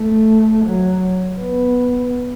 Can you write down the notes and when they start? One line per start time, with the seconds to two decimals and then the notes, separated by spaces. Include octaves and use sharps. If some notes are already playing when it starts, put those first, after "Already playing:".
Already playing: A3
0.66 F#3
1.39 B3